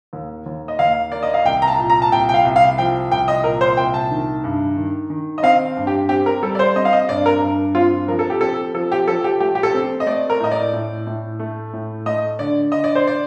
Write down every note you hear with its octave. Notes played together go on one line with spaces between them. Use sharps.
D#2
D#2
D#5
D#2 F5
A#3 D5
D#5
F5
C2 G5
A#5
A5
A#2
A#5
A5
C2 G5
G5
F5
C2
F5
F3 G5
C2 G5
D#5
A#2 A#4
C5
C2 G5
A5
D#3
G2
D#3
D#3
D#5
C4 F5
G2
G4
C4 G4
A#4
G3 A4
D5
C5
C4 D#5
F5
D#5
G2 D5
A#4
G2
C4 F4
F3 A#4
A4
G4
C4 A4
F3 A4
G4
F3 A4
G4
A3 G4
G4
A4
C4
D#5
A3 D5
A#4
A2 D#5
D5
A2
A2
A3
A2
A3 D#5
D3 D5
D3 D#5
D5
C5
D5